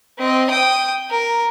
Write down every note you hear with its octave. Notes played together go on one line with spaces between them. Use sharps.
C4 D#5
G5 D#6
A#4